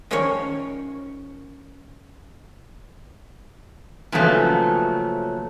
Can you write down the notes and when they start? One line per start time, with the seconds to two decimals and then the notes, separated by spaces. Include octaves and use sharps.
0.11 D#3 F3 G3 C#4 A#4 C#5
4.12 A#2 C#3 F3 F#3 A3 B3